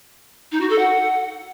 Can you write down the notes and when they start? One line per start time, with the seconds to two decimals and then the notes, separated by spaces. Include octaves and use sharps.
0.52 D#4
0.61 F#4
0.70 A4
0.78 F#5